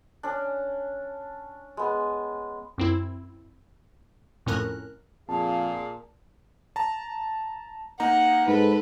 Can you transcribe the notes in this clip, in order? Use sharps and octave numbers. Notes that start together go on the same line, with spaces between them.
C#4 D4
G#3 B3
F#2 C4 E4
F2 A2 C#4 A#4 F#6
F2 A#2 G#4 F5 A5
A5 A#5
A#3 D#4 F#5 A#5
G#2 A4 B4